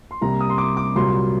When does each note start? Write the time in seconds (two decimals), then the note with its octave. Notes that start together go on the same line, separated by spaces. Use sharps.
0.11 C6
0.21 C2 C3 G3 A#3 A#5
0.41 D#6
0.50 C6
0.58 D6
0.77 D6
0.96 C2 A#2 F#3 A#3 C6